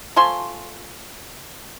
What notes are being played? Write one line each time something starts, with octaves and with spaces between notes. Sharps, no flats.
F3 A3 G#5 C6